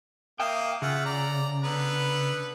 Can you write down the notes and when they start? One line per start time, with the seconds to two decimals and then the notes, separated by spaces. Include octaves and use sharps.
0.40 A#3 E5 F5 G5 D#6
0.82 C#3 F4 E5 F#5
1.06 D5 A#5
1.63 D3 B3 B4